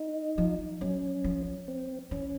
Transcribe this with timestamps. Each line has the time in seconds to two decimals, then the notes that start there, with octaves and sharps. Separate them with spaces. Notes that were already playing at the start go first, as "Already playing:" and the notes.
Already playing: D#4
0.38 F3
0.81 F#3 C#4
1.24 F3
1.68 C4
2.11 E3 C#4